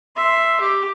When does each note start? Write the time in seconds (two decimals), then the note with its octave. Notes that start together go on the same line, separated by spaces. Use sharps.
0.16 E5 C6
0.61 G4